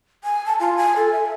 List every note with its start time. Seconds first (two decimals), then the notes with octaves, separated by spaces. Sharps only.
0.24 G#5
0.46 A5
0.60 F4
0.77 G#5
0.96 A4
1.12 E5